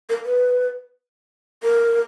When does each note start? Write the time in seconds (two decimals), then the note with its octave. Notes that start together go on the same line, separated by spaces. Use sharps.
0.09 A#4
0.25 B4
1.63 A#4